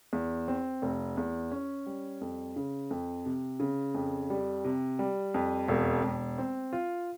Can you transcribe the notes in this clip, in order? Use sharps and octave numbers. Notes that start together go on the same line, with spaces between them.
E2
C4
F1
E2
C#4
G3
F2
C#3
F2
C3
C#3
F2
G3
C3
G3
F2
E1
E1
C4
F4